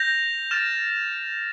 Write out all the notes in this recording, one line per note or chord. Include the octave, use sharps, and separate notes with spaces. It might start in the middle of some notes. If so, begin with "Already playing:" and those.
Already playing: G6 A#6 F7
F6 A6 E7